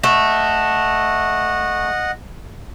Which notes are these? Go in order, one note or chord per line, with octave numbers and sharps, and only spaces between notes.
A3 D#5 F#5